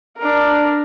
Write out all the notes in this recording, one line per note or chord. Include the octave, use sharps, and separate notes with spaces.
D4 A#4